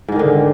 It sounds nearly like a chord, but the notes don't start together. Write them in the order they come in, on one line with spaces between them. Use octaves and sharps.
G#2 G#3 D#3 D3